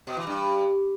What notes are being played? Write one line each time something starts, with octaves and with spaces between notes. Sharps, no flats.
B2
E3
G2